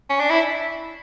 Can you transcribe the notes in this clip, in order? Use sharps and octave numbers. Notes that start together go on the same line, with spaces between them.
C#4
D4
E4